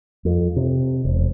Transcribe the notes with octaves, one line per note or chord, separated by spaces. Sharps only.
F2
C3
E1